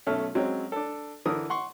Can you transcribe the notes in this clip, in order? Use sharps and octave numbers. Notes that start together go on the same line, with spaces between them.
B1 A3 C#4 A4 E5 F6
F#3 G#3 C4 C#4
D4 A4
D3 E3 A#4 D#6
F#5 C6 C#6